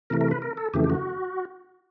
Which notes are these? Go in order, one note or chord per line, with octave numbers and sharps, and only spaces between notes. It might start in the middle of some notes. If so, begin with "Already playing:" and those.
C3 E3 A3 A#4
A#4
B4
A#4
A4
F2 C#3 E3 A3 G4
G4
F#4